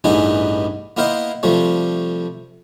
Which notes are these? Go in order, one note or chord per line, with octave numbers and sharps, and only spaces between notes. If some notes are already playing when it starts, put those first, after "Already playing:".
A1 G2 E3 B3 D#4 G#4
A#3 B3 E4 A#4 C5 D#5
C3 F3 G3 A3